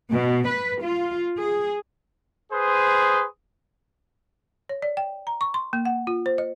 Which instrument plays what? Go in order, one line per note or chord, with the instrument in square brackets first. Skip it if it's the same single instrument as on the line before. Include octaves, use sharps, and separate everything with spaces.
[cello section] B2
B4
F4
G#4
[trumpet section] G#4 B4 C5 C6 D#6
[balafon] C#5
D5
G5
A#5
C#6
C6
A#3
F#5
F4
C5
D#5